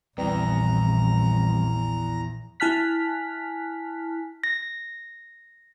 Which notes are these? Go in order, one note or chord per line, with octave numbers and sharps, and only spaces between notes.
A#1 E2 E3 G3 C4 A#5
E4 G#5 A5 F6 F#6 B6
A#6